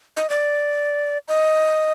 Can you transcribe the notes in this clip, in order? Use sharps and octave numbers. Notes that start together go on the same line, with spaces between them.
D#5
D5
D#5